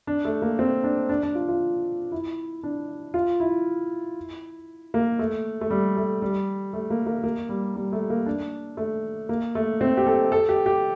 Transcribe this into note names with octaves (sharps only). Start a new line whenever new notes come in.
D4
A3
A#3
C4
D4
D4
D4
F4
F4
E4
D4
F4
E4
A#3
A3
A3
G3
A3
G3
A3
A#3
A#3
A#3
G3
G3
A3
A#3
D4
A3
A#3
A3
C4
G4
A4
A4
G4
G4